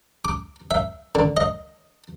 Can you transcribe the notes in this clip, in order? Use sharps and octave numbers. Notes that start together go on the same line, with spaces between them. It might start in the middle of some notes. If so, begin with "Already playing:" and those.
D6
E5
D3
D#5